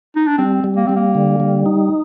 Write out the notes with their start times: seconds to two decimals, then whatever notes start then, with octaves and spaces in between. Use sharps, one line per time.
0.16 D#4
0.27 D4
0.38 G3 C4
0.64 G3
0.76 A#3
0.87 G3 C4
0.96 A#3
1.15 D3
1.40 G3
1.66 D#4